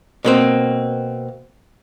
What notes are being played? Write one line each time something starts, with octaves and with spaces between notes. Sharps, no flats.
B2 A#3 C4